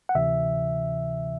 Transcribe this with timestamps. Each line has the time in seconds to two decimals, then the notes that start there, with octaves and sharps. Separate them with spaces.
0.09 F#5
0.15 D2 C3 E3 E5